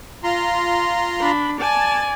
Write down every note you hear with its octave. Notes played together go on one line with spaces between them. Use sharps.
F4 A#5 C6
D4 B5
D5 G#5 A5